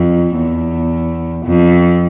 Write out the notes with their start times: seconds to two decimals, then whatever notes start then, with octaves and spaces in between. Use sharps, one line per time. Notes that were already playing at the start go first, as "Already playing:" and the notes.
Already playing: F2
0.37 E2
1.46 F2